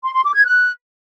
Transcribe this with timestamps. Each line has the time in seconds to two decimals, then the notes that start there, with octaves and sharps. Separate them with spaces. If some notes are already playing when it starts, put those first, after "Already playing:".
0.03 C6
0.13 C6
0.24 D6
0.34 G#6
0.44 F#6